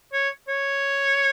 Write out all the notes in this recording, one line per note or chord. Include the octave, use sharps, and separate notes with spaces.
C#5
C#5